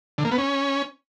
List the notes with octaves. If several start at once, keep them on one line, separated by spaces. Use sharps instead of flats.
D3
A#3
B3
C#4